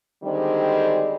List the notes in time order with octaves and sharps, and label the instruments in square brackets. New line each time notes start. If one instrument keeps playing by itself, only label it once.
[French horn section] D3 D#3 G3 G#3 C4 D4